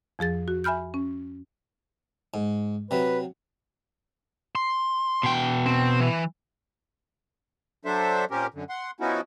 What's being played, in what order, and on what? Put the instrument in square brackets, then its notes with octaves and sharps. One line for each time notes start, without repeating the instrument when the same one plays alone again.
[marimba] F2 F3 G#4 A6
F#4
E5 G#5 B5 F6 G6
C#4
[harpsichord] G#2
[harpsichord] C3 F#3 [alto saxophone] B4
[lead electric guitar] C6
[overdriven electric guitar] B2 G5
[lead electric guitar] C4
E3
[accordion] F#3 D4 A4 C5 E5
A#2 C4 C#4 G4 A#4
F#2 D3
F#5 C6
F3 B3 C#4 D#4 E4 F#4